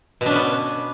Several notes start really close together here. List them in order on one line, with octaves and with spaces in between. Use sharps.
B2 D4 C#4 B3